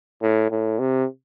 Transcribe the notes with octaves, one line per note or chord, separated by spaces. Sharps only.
A2
A2
C3